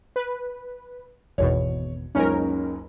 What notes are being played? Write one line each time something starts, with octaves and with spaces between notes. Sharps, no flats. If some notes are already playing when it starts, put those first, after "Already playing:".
B4
G#1 E2 B2 C#5
F#1 C#2 C#4 D#4 A#4